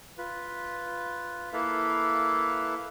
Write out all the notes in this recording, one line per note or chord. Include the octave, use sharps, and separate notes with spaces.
F4 B4
A#3 E4 A4 B4 F5